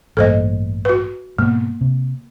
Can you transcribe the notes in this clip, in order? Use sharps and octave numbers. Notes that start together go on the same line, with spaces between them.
A1 G2 A#3 A4 C5 D#5
F#4 B4
G#2 B2 G#3 A#3
C3